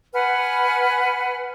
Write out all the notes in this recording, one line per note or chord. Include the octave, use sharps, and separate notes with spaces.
B4 F#5 G#5 F6